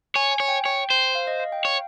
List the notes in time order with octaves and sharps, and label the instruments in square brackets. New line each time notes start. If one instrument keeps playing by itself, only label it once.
[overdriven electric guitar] C#5 [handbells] G#5
[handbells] G#5
[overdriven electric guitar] C#5
[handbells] G5
[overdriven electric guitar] C#5 [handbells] G5
[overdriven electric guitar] C5
[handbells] F5
D#5
F5
G5
[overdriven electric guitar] C#5 [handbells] F5